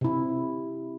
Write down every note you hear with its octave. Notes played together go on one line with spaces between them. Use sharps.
C3 E4